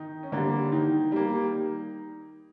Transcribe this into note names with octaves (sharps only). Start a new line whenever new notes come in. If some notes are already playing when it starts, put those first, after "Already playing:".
Already playing: D#3 D#4
C#4
D3 G3 A#3 D4
D#3 D#4
G3 A#3